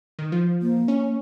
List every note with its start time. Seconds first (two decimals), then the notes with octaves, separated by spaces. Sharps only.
0.19 D#3
0.32 F3
0.61 A#3
0.88 C#4